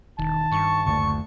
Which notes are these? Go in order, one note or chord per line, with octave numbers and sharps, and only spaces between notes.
E1 D#3 A5
G2 C#6
F#1 D2 D3 C#6